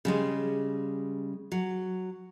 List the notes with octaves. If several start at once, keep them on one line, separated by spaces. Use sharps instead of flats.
C#3 G3 G#3
F#3